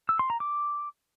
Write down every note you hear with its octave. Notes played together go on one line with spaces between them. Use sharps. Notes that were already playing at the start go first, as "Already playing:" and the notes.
E6
C6
A#5
D6